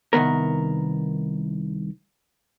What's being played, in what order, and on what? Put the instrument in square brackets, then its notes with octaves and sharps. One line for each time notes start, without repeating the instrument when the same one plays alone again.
[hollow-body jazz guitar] C2 D#3 B3 A#4